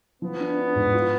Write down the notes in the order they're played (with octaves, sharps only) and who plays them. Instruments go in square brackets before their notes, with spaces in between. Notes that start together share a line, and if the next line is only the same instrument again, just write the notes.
[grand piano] F3 [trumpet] B3
[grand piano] D4
D4
G#2
F4